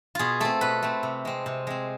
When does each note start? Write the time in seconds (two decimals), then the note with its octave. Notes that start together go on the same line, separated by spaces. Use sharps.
0.15 B2 F4 G#4
0.40 A3 C4 A4
0.61 B2 B4
0.82 A3 C4
1.03 C3
1.25 G#3 C4
1.46 C3
1.67 G#3 C4